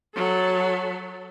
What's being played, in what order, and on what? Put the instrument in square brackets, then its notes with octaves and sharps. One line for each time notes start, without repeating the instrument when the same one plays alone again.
[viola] F#3 A4